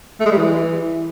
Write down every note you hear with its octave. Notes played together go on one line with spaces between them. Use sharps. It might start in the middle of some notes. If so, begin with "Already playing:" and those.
A3
G#3
G3
E3